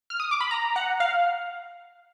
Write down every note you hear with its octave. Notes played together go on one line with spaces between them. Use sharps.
F6
D#6
D6
B5
A#5
F#5
F5